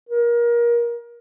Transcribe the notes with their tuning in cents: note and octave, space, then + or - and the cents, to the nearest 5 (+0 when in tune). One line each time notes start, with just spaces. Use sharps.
A#4 +25